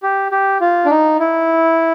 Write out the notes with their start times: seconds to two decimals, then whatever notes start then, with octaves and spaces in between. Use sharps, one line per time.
0.03 G4
0.32 G4
0.61 F4
0.85 D4
0.91 D#4
1.20 E4